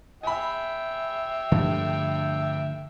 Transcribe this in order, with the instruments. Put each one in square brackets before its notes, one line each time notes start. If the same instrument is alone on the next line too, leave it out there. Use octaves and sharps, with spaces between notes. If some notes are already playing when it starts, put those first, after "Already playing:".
[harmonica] E5 G5 [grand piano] G#5 B5
[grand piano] G2 [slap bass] D3 F3 A3